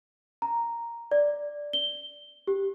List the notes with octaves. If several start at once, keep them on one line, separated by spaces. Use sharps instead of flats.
A#5
D5
G7
G4